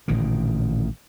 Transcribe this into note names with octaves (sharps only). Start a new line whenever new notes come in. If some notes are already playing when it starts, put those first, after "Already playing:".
A1 A#2 D3 D#3